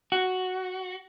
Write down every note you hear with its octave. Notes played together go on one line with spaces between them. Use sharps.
F#4